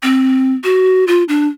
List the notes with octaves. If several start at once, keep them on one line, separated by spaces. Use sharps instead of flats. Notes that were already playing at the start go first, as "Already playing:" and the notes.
C4
F#4
F4
D4